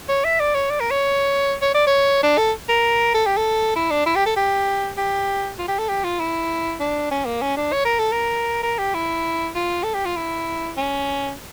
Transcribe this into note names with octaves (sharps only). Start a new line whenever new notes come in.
C#5
E5
D5
C#5
D5
A#4
C#5
C#5
D5
C#5
D4
A4
A#4
A4
G4
A4
E4
D4
E4
G4
A4
G4
G4
F4
G4
A4
G4
F4
E4
D4
C#4
A#3
C#4
D4
C#5
A#4
A4
A#4
A#4
G4
E4
F4
A4
G4
F4
E4
C#4